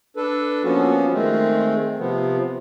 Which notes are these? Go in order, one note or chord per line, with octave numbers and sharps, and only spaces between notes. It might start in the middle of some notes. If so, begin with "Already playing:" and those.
D4 A4 B4
F3 A#3 B3 C#4 F#4
D#3 G#3 A3 C4
C3 F3 B3